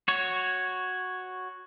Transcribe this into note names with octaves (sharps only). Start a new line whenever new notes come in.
F#4 C#5